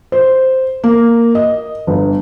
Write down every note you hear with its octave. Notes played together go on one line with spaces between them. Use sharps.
C5
A#3
D#5
G1